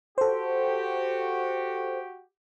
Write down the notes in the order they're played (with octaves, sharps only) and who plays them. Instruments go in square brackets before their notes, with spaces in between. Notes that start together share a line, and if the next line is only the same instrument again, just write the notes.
[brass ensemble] F#4 G4 [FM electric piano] A4 C5